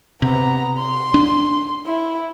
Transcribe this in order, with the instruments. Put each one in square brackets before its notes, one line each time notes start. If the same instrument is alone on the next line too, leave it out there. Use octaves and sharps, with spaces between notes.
[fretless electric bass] C3 [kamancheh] B3 A#5
[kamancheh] C6
[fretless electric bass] D4
[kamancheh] E4